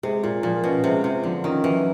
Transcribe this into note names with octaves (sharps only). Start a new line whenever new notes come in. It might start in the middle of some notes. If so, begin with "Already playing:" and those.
C3 G#3
A#2 F4
A#2 F3
B2 C#4
C3 G#3
C3 F4
D3 F3
D#3 C#4
E3 F#3